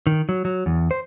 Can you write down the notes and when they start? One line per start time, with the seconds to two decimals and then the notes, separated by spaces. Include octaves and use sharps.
0.07 D#3
0.29 F#3
0.45 F#3
0.66 E2
0.91 C5